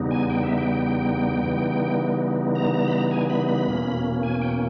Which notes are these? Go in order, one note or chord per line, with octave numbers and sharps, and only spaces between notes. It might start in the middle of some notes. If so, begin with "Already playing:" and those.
Already playing: E2 C#3 G3 B3 D#4
G#5
G5
E5
G5
C#3 E3 G3 B3 D#4
A#5
A#5
B5
A#5
G#5
B5
B5
E2 B2 A#3 C#4
G#5
G5